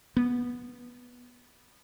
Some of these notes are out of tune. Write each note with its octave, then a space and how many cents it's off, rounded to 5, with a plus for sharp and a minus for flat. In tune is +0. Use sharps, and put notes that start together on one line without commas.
B3 -15